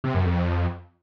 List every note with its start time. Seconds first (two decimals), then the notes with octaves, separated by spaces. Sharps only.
0.04 C3
0.15 F#2
0.25 F2